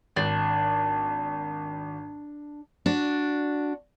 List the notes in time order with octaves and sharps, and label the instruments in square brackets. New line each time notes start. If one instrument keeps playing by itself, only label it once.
[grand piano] G#1 [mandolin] D4
[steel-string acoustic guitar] D4 F#4